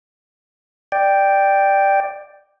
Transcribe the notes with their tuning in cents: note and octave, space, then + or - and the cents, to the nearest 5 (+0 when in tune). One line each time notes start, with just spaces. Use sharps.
D5 +10 G5 +0